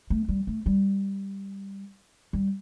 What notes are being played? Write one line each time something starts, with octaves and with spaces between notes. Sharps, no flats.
A3
G3
A3
G3
G3